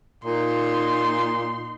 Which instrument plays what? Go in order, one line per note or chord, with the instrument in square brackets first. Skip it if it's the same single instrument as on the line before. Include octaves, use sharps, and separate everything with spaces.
[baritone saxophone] A#2 [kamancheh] D#4 C6